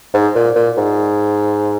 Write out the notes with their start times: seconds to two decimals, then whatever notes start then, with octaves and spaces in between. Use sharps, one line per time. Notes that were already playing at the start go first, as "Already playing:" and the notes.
0.14 G#2
0.35 A#2
0.56 A#2
0.77 G#2